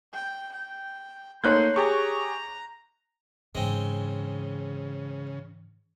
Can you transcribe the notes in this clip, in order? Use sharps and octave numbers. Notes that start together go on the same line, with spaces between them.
G5
G5
A3 A#3 D#4 C#5 C6 F#6 G6
G4 G#4 A#5 C#6
G#2 C#3 E3 G#3 C4